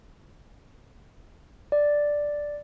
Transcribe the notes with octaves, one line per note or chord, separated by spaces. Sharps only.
D5